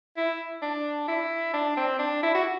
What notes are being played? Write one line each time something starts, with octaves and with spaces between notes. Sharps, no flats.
E4
D4
E4
D4
C4
D4
E4
F#4